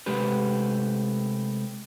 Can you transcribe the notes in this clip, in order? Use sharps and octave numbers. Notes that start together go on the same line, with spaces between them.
C3 G#3 A3 G4 B4